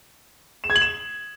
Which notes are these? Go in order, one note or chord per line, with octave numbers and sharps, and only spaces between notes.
E7
G#6
F#7
E7